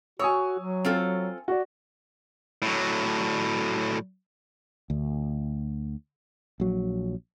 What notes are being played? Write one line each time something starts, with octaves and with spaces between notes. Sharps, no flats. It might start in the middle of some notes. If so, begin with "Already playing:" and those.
F#4 C#5 G#5 D#6 E6
F#3
C4 F4 A4
F#4 D5
A2 F#3
D2
A#1 F#3